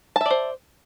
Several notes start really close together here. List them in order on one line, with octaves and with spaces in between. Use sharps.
A5 E5 D5 C5